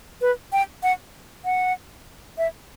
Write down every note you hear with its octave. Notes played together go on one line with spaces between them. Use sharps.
B4
G5
F#5
F#5
E5